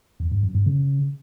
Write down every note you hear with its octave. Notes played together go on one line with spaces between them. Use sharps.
E2
G2
F#2
G2
C#3